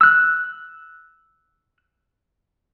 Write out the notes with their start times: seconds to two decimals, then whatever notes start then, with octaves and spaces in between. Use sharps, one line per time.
0.01 E6 F#6